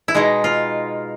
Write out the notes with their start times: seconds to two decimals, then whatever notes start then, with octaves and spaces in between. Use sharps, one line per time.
0.08 E4
0.14 B2 G#3 D#4
0.44 F4